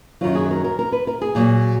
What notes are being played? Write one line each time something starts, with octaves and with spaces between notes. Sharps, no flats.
F#2 D#3 F#3 F4
G#4
A#4
A#4
A#4
B4
A#4
G#4
A#2 F#3